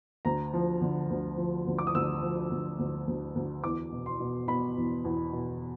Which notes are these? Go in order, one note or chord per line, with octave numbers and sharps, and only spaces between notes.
D2 A#5
F3
D3
D2
F3
D2
D6
D#6
D2 E6
F3
D2
D2
D2
D2
E2 D6
B2
C6
B2
B2 B5
E2
E2
B2